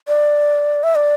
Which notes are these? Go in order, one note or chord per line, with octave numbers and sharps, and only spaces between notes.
D5
E5
D5